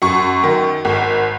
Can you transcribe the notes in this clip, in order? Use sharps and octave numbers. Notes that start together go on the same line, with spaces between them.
F#2 C#6
D#3
G#1